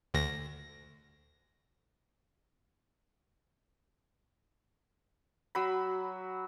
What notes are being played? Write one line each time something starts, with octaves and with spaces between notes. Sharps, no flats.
D2 A#6
F#3 B5